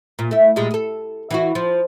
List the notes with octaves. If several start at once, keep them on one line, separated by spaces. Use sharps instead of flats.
A#2
A3 E4
A#2 G3 G#3
G#4 A4
E3 E4 F#4
F3